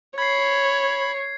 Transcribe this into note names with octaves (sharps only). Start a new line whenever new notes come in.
C#5 B5 G#6 C7